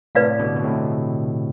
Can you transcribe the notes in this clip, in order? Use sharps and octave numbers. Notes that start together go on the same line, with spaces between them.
A2 C3 B4 D5 F5
B2 D3
B2
A2 C3